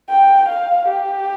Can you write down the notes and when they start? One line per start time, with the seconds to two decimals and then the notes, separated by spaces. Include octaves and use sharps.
0.10 G5
0.48 F5
0.88 G4